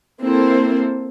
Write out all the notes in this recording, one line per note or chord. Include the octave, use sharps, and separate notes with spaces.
A#3 C4 E4 A4 C5